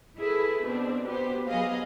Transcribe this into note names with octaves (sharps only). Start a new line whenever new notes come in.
E4 G#4 A4 B4
B2 C4 D4
B3 G4 C5
F#3 B3 G#4 D#5 F5